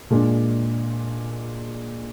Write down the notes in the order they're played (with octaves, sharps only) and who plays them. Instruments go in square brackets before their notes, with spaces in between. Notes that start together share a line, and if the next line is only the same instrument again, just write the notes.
[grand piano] A#2 G#3 D4